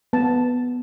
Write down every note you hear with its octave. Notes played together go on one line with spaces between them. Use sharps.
B3 A5